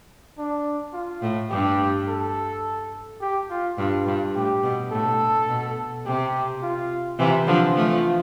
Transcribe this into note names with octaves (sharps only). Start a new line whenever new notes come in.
D4
F4
A2
G2 G4
A4
G4
F4
G2 F4
G2
A2 G4
B2
A2 A4
B2
C3 G4
F4
C3 E3 F4
D3 F3
F3 A3